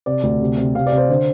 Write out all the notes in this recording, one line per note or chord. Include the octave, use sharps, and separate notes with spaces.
C3 D5
D2
C3
C3
C3 F5
D5
C3
C5
D3 C5